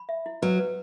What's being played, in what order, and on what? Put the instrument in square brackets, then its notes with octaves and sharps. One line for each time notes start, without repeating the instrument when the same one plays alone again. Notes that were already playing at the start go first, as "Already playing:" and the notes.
Already playing: [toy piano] B5
E5
E4
[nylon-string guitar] F#3 [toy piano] B4
[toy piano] B4